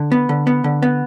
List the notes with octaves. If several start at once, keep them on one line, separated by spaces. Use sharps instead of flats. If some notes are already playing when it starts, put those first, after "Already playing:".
Already playing: D3
B3
D3
B3
D3
B3